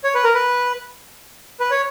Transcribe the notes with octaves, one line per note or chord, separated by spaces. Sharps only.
C#5
B4
A#4
B4
B4
C#5